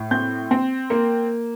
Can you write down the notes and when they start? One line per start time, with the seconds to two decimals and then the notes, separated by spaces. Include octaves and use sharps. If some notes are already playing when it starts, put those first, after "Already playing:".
Already playing: A2
0.11 C4 G6
0.51 C4
0.90 A#3